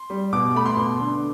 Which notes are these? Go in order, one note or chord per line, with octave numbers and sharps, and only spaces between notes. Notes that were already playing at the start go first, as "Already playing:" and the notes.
Already playing: C6
G3
B2 D6
A3 B5
C6
B2
D3